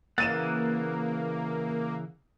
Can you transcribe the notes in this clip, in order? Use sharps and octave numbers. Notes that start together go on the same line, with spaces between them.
C#3 E3 A#3 F#5 A6 D#7 E7